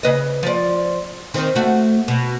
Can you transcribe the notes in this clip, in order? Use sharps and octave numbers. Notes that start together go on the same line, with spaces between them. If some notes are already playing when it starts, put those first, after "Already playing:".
C#3 B4 D#5
F3 D5
D#3 C4
A3 F#4
B2